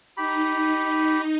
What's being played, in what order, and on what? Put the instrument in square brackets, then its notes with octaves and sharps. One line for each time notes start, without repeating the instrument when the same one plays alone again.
[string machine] D#4 [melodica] G4 B5